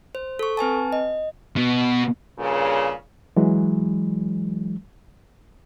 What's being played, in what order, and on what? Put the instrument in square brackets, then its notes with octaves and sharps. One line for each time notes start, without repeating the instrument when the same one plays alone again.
[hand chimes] C5
A4 C#6
C4 B4 G#5 A5
D#5
[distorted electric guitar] B2
[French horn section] G2 A#2 C#3
[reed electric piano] E3 F#3 G#3